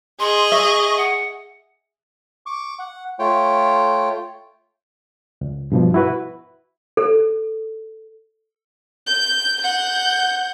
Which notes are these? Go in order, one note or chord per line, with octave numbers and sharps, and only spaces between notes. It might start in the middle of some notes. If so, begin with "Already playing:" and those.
G#4 D#5 C6
E5 C#6
F#5
C#6 D6
F#5
A3 F4 C#5 G5
C#2
G2 B2 F3
E4 F#4 B4
A4
G6
F#5 G6